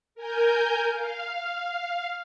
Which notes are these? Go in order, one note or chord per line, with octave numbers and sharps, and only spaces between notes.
A#4 G#5 G6
F5